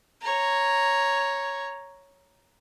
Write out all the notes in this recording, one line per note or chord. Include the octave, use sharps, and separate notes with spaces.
C#5 A#5